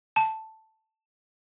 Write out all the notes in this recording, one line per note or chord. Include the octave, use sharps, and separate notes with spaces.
A5